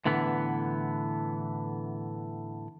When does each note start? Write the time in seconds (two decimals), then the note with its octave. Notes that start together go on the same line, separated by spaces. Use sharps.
0.05 A2 D3 E3 B3